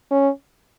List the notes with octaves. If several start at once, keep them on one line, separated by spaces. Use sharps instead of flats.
C#4